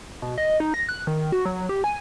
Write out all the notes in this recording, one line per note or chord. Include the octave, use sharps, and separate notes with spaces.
B2
D#5
D#4
A#6
F#6
D#3
F#4
F#3
G4
G#5